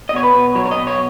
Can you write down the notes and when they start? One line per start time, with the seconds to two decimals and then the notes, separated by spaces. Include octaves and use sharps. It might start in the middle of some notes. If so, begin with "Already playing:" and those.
0.09 D#5
0.13 B2 C#5
0.23 B4
0.34 B2
0.55 F#3 C#5
0.65 C#5
0.71 B2 D#5
0.87 C#5